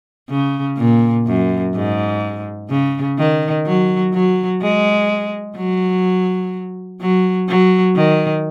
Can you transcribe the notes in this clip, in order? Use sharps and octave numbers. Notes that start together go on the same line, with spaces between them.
C#3
A#2
F#2
G#2
C#3
D#3
F#3
F#3
G#3
F#3
F#3
F#3
D#3